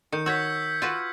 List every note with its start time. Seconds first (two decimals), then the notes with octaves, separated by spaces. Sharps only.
0.12 D#3 G6 C#7
0.26 F#4 C#5 E6 G6 G#6 B6
0.82 F4 F#4 B4